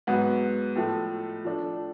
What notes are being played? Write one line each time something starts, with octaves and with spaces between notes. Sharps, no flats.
G#2 F#3 B3 F#4
A2 F3 A3
F3 A3 D4